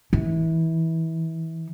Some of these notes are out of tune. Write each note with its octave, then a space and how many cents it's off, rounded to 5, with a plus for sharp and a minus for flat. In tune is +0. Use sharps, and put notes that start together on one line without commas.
E3 -25